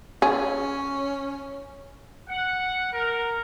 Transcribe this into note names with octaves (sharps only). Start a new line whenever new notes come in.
C#4 G#4
F#5
A#4